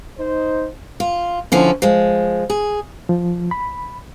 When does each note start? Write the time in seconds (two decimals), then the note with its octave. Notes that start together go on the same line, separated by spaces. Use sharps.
0.20 D#4 C5
1.00 F4
1.52 D3 F3 C#4 E4
1.82 F3 G#3
2.50 G#4
3.09 F3
3.51 B5